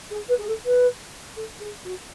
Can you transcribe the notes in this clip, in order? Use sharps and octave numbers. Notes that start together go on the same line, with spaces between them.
G#4
B4
G#4
A4
B4
A4
G#4
F#4